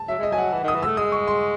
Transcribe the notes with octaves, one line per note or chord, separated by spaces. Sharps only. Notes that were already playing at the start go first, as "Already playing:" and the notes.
Already playing: A5
F#3 E5
G#3 D#5
F#3 G#5
F#5
E3 F#5
D#3 D#6
E3
A3 E6
G#3 D#6
C#6
C6